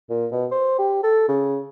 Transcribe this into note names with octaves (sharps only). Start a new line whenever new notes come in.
A#2
B2
C5
G4
A4
C#3